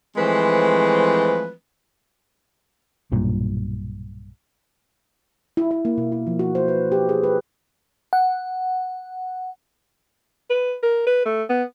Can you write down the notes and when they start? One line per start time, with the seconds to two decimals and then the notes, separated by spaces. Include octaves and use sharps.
0.17 E3 F3 G#3 A3 C4 B4
3.12 B1 G2 A#2
5.57 E4
5.71 E4
5.85 A#3
5.98 B2
6.12 E4
6.27 F3
6.39 F#4
6.55 C5
6.68 B4
6.92 G4
7.09 G#4
7.23 B4
8.13 F#5
10.50 B4
10.83 A#4
11.07 B4
11.26 A3
11.50 B3